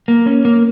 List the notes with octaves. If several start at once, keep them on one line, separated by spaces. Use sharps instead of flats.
A#3
C#4
A#3